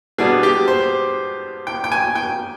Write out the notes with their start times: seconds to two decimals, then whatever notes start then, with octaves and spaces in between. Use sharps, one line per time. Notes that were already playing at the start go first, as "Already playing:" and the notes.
0.18 B2 G3 B3 D4 G#4
0.43 G4
0.68 C5
1.67 G5
1.84 G5
1.92 G#5
2.15 G5